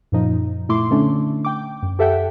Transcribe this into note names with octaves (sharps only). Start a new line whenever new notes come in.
F#2 A#2 F3 D#4
A#2 A3 E4 C6 D6
D3 A3 C#4 D4
G5 D6
F#2
G4 A4 E5 F#5 G5